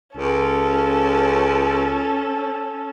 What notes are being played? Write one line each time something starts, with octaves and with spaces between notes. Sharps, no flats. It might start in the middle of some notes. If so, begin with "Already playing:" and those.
C#2 C#4 A4